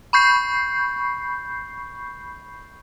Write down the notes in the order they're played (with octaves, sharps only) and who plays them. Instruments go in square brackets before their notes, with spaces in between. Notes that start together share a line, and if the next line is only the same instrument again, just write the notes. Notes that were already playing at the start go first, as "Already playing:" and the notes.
[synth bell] B5 C#6 G6 C7